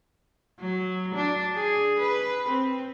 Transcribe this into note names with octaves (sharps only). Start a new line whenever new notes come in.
F#3
D4
G#4
B4
C4